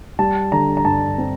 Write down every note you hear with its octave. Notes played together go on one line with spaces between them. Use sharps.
G3 A5
D3 A#5
A#5
G2 A5
C4